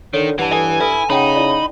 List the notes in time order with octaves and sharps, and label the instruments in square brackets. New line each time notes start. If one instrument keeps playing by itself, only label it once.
[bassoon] D3 [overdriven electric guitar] D#3 [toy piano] C#5
[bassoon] G2 [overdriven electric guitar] E3 [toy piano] F#5 A5
[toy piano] A4 [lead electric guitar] G#5
[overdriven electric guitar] E4 [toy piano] A4 B4 E5
[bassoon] C#3 [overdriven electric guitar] D#4 [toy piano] F#5 G5 A5 [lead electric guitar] B5
[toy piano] E4 D5